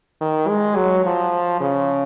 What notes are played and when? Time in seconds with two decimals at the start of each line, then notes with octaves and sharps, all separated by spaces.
0.21 D#3
0.48 G#3
0.76 F#3
1.05 F3
1.61 C#3